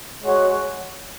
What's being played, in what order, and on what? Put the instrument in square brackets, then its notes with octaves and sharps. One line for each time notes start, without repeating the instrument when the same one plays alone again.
[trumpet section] G#3 F#4 C#5 F#5